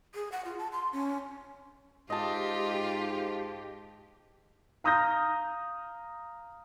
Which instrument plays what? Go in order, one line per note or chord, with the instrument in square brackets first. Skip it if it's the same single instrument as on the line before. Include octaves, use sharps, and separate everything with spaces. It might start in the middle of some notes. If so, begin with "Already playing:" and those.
[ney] G#4
F#5
F4
A5
C6
C#4
[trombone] G#2 [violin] F4 [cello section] G4 [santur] D#5 A5
[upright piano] F5 A#5 D#6 F6 G6 A#6